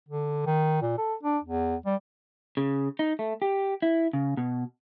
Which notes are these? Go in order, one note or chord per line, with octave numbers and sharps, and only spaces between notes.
D3
D#3
A#2
A4
D4
E2
G3
C#3
D#4
A3
G4
E4
C#3
B2